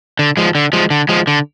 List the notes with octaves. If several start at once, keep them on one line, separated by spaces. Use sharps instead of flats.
D3
F3 G#3
D3
F3 G#3
D3
F3 G#3
D3